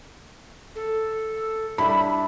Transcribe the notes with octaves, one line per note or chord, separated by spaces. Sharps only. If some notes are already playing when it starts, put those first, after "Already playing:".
A4
G3 D4 E4 B5